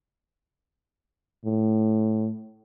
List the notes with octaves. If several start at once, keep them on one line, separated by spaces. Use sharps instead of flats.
A2